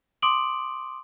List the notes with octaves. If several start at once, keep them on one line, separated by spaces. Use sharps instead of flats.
C6 D6 D#6 D7 F#7